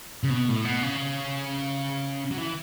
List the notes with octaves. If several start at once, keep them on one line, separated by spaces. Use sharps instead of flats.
C#3
B2
A2
B2
C#3
F#3
E3